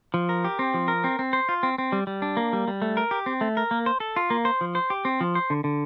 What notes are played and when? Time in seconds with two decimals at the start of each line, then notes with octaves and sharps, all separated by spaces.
0.14 F3
0.29 A#4
0.45 G4
0.59 C4
0.74 F3
0.88 A#4
1.04 C4
1.19 C4
1.33 C5
1.49 F4
1.63 C4
1.78 C4
1.92 G3
2.07 G3
2.22 D4
2.37 A#3
2.53 G3
2.68 G3
2.82 A3
2.97 A#4
3.11 G4
3.26 C4
3.41 A3
3.57 A#4
3.71 A#3
3.86 C5
4.00 A4
4.16 F4
4.30 A#3
4.45 C5
4.61 F3
4.75 C5
4.90 G4
5.05 C4
5.21 F3
5.35 C5
5.50 D3
5.64 D3